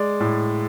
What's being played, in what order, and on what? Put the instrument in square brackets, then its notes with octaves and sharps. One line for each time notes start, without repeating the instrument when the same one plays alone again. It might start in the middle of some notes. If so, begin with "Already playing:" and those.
Already playing: [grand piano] G#3 D5
A2